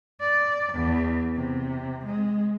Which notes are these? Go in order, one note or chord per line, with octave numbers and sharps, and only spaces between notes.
D5
E2
C3
G#3